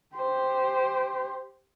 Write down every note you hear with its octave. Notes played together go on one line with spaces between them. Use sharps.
G4 C5